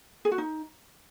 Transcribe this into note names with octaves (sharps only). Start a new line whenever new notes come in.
G#4
F#4
D#4